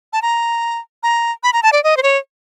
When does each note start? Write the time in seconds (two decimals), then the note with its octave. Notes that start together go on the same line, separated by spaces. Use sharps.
0.13 A5
0.22 A#5
1.03 A#5
1.43 B5
1.53 A#5
1.63 A5
1.73 D5
1.84 D#5
1.97 C5
2.03 C#5